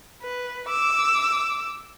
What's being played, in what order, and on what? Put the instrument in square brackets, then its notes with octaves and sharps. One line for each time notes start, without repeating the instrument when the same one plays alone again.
[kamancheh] B4
D6 E6